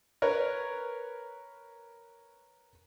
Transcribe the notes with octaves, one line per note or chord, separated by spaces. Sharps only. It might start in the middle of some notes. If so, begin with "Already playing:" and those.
A#4 B4 C#5